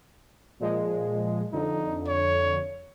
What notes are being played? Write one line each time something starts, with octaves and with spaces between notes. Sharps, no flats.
A#2 F3 G#3
F2 D3 D#4
C#5